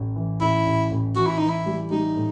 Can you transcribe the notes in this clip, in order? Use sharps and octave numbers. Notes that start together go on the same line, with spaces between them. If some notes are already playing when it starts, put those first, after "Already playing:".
Already playing: A1 A3
E3
A1 E4
A1
A1
E3 F#4
E4
E3 D#4
E4
G3
G3 D#4
A2